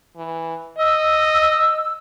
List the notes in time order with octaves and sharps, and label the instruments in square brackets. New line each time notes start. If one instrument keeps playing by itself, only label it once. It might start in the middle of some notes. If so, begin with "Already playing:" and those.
[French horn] E3
[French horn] D#5 [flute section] E6